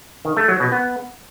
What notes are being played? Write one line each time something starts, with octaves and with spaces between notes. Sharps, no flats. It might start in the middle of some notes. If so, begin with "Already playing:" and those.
D#3
A3
F#3
B2
B3